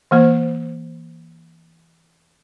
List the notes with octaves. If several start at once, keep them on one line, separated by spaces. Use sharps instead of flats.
E3 A#3 C5